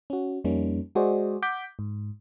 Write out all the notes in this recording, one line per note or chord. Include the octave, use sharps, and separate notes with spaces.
C#4 F#4
F2 G3 A#3 C#4 D#4
G#3 F#4 G#4 C5 D5 D#5
F#5 D6 G6 B6
G#2